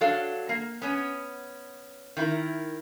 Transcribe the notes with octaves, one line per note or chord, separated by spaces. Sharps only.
F#3 D4 A4 F5
A#3
B3 C#4
D#3 E4 A#4